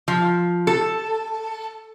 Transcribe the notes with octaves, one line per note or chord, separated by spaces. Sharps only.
F3
A4